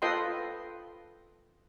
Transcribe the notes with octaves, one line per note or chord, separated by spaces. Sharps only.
F4 A4 B4 D#5 G5 C6